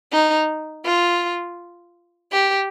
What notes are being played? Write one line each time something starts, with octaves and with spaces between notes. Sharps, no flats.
D#4
F4
G4